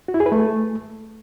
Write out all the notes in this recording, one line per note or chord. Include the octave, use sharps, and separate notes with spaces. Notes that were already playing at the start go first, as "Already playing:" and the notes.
F#4
E4
G#4
B4
A3